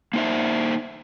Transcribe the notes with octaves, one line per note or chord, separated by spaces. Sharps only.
A#3 D#4 C5 E5